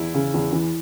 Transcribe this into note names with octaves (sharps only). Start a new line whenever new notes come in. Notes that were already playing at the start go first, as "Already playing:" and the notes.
Already playing: E2 E4
C#3
E2
E3